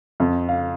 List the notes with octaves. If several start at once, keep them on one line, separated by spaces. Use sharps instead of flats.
F2
F5